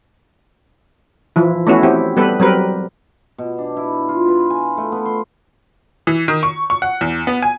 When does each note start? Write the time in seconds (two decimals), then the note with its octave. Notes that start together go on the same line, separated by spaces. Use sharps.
1.36 E3 F3 E4
1.67 A3 B3 C#4 E4 F#4
1.83 C4 E4 G4
2.17 G3 B3 G4 A4 B4
2.40 F#3 G3 C4 A#4 B4
3.38 B2
3.58 D4
3.77 E4
4.09 F4
4.28 B4
4.50 G#5
4.77 A3
4.92 B3
5.05 C6
6.07 E3
6.28 D#3
6.43 C#6
6.70 C#6
6.82 F#5
7.01 E2
7.27 B3
7.42 G#5